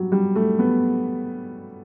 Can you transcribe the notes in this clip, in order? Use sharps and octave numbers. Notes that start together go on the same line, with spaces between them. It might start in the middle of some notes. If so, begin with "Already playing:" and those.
Already playing: F#3 G3
G3
A3
B3